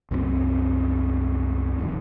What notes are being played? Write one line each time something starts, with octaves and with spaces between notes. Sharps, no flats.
C2 F#2 G#3 C4
D#1 C2 F2 D#3